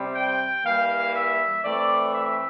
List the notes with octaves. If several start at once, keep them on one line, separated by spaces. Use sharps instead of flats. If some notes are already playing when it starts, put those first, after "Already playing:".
Already playing: C3 G3 C4
G5
E3 G3 A#3 F5
E5
E3 A3 C4 D5
E5